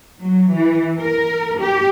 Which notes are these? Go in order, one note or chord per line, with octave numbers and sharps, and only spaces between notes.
F#3
E3
A#4
G4